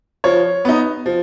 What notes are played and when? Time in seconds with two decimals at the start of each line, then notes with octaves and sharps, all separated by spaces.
0.24 F3 C#5
0.65 B3 D#4
1.06 F3